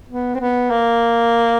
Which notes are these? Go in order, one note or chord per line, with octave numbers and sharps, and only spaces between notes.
B3
C4
B3
A#3